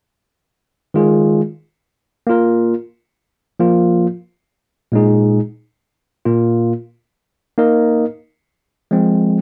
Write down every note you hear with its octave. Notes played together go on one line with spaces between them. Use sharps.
D#3 G#3 F4 G#4
A#3 F4 A#4
F3 A#3 F4
A#2 G#3 D#4 G#4
A#2 A#3 F4
A#3 D#4 A#4 D#5
F3 G#3 C4